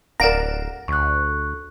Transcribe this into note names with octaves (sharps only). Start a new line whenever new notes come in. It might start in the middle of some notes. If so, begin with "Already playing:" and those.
D1 A#4 D5 F5 F#5 A#5 D7 E7
D2 C#6 F#6